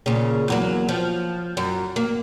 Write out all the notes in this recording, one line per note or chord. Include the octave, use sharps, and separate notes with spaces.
A#2 C#3
E2 F#3 A#3
F3
F#2
A#3